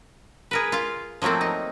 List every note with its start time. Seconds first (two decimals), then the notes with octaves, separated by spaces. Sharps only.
0.51 G#4 A#4 B4
0.72 F4 F5
1.22 F3 F#3 A3 A#3 C4
1.41 D#4